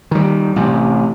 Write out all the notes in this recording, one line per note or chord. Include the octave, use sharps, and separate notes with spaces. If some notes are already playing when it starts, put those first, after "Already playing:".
D#3 G3
A1 C3